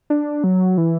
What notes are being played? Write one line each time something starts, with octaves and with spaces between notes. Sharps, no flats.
D4
F#3
E3